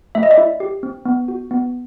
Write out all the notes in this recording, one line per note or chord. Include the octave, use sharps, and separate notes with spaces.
A3 E5
D#5
D5 E5
E4
G4
C4
B3
F#4
B3